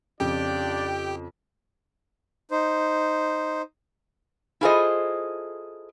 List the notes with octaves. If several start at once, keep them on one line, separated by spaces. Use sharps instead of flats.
F2 C#3 D4 F4 G4 D5 G5
D#4 C5
E4 F4 G#4 A4 C5 D#5